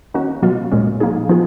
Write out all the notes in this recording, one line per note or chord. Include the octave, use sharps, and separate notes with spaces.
D#3 A#3 C#4 F#4
B2 F#3 A#3 F4
A#2 G#3 C#4
F3 A#3 D#4 G#4
F3 B3 F4 G#4